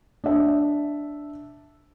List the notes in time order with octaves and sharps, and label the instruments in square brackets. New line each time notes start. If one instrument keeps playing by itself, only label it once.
[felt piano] D4 E5